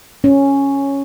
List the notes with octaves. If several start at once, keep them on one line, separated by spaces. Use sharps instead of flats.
C#4